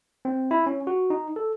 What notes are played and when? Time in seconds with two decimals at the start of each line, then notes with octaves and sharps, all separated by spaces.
0.25 C4
0.51 E4
0.66 C#4
0.87 F#4
1.10 D#4
1.36 A4